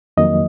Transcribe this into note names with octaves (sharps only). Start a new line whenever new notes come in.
F2 D#3 F#3 A#3 D#5